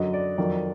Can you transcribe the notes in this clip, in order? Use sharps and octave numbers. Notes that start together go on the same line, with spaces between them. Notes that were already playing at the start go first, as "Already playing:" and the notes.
Already playing: F#2 D3 F#3 D#5
D5
F2 D#3 F#3 D5